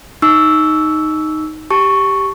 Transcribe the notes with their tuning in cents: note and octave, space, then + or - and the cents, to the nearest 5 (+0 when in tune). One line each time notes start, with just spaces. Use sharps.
D#4 +0 C#6 +35 E6 +0
G4 +0 A5 +0 C#6 +0